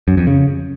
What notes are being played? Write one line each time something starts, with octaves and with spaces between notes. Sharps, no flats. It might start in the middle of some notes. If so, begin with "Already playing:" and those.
F#2
F2
C#3